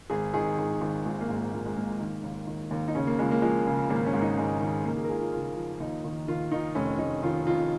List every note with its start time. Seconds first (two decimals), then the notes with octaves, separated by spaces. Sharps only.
0.10 G#1 G#4
0.34 D#3 G#4
0.58 G#1
0.81 G#1
1.05 A#1 G#3
1.21 A#3
1.29 G#2
1.36 A#3
1.52 A#1 A#3
1.65 G#3
1.76 G#2 A#3
2.00 D#3
2.23 D#2
2.47 D#3
2.71 D#2
2.88 D#4
2.95 C#3 C#4
3.07 A#3
3.19 C#2 G#3
3.31 A#3
3.42 F3 G#3
3.67 C#3
3.90 G#1 A#3
4.06 C#4
4.13 G#2
4.22 D#4
4.38 G#1 G#3
4.61 D#3
4.85 C#3 A#3
4.97 G#4
5.04 A#4
5.09 C#2 G#4
5.21 F4
5.33 C#3 F4
5.56 F3
5.80 D#2 D#4
6.04 D#3
6.28 D#3 F4
6.52 D#3 D#4
6.75 F1 C#4
6.99 F1 D#4
7.23 D#3 F4
7.46 F2 F4